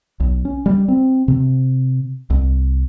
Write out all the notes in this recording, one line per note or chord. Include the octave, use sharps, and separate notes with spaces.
B1
C#4
G3
C4
C3
C2